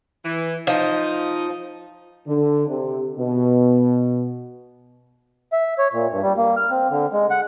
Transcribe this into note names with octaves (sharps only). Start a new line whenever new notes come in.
E3
F3 D#4
D3
C3
B2
E5
C#5
A#2
G2
G3
A#3
F6
C4
D3
G#3
F#5